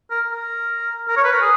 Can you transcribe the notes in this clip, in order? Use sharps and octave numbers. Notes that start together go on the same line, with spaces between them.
A#4
A#4
A#4
C#5
B4
A#4
G#4